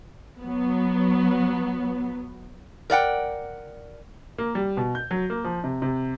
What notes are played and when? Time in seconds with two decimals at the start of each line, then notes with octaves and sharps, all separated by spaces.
0.40 F#3 B3
2.90 A#4 D5 F#5 G5
4.38 A#3
4.55 G3
4.77 B2
4.95 G6
5.11 F#3
5.30 A#3
5.44 F3
5.64 C3
5.82 C3